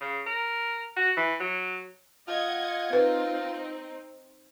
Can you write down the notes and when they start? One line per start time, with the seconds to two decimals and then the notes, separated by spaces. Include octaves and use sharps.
0.01 C#3
0.27 A#4
0.96 F#4
1.17 E3
1.40 F#3
2.28 F4 D#5 F#5 G#6
2.93 C4 D#4 B4